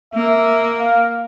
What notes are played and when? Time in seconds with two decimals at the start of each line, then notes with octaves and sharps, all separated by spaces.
0.14 A#3 E5
0.80 F5